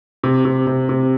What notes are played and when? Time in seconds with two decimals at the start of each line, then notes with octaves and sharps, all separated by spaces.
0.24 C3
0.45 C3
0.67 C3
0.89 C3